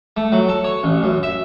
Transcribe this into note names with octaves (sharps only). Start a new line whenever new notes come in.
A3
F#3
A4
C#5
A1
F#2
E5